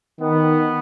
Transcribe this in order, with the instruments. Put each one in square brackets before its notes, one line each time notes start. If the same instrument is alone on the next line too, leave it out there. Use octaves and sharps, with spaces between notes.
[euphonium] D#3 [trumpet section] B3